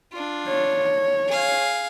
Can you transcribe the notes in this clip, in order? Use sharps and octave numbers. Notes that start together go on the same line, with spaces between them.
D4 F4
C#5
G#4 F5